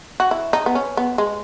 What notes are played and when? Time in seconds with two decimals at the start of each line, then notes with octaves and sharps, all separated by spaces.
0.20 F#4
0.31 E4
0.53 D#4
0.66 B3
0.75 C#4
0.97 B3
1.18 G#3